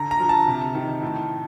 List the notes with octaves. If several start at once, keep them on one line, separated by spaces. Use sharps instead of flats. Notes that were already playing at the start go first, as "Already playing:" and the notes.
Already playing: D3 A#5
A#5
F3
A5
C3
D#3
A2